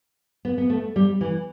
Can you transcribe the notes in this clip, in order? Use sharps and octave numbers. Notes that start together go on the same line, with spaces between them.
B3
B3
A3
G3
E3